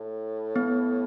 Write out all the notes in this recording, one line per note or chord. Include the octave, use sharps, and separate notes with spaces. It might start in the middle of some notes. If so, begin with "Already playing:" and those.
Already playing: A2
B3